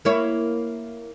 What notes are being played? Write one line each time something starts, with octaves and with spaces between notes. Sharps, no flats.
A#3 E4 C#5